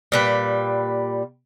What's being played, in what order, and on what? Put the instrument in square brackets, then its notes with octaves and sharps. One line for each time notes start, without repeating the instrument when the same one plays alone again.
[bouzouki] A#2 G3 B4